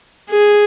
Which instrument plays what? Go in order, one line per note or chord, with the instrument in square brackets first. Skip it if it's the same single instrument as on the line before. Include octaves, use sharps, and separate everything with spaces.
[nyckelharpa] G#4